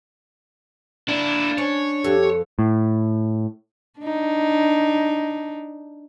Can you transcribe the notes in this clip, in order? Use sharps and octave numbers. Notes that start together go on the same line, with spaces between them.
A#3 D4 E4
C#4 C#5
F2 G4 A4
A2
D4 D#4